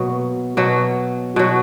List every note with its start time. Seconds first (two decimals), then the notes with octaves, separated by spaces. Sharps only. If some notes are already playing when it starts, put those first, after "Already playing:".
Already playing: B2 F#3 A#3
0.57 B2 F#3
1.36 B2 F#3